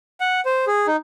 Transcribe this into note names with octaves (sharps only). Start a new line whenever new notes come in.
F#5
C5
G#4
D#4